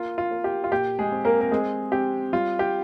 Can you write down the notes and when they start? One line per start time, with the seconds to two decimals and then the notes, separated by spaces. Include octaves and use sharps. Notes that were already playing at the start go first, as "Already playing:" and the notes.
Already playing: A#3 F4
0.18 F4
0.31 A#3
0.44 G4
0.64 F4
0.71 A#2 G4
0.99 G#3 G#4
1.12 C4
1.25 A#3 A#4
1.41 A#4
1.51 G#3 C4 G#4
1.92 C4 G4
2.33 G3 F4
2.59 G4